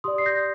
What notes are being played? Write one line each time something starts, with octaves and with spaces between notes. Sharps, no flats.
G4 D5 C6 D#6
C7
G6 A#6